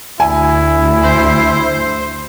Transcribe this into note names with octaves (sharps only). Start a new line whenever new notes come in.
D2 E4 G#5
C5